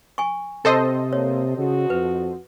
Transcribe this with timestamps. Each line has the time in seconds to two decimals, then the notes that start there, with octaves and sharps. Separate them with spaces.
0.18 G#5 C#6
0.65 C3 C4 A4 C5 D#5
1.13 A#3 C#5
1.58 C#3 F#4
1.90 F2 B4